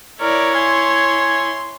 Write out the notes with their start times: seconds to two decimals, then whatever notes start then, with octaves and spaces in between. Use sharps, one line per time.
0.21 E4 A#4 C#5 D5
0.55 G#5 C6